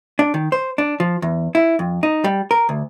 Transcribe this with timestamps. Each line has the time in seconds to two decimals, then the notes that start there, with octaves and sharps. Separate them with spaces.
0.19 D4
0.34 D#3
0.52 C5
0.78 D4
1.00 F3
1.22 E2
1.55 E4
1.79 F2
2.03 D#4
2.24 G3
2.51 A#4
2.69 D2